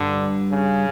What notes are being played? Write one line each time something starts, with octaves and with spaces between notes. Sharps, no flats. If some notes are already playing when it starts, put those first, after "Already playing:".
Already playing: G2 D3 G3
C#3